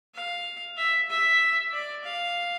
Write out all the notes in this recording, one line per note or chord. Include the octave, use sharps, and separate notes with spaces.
F5
E5
E5
D5
F5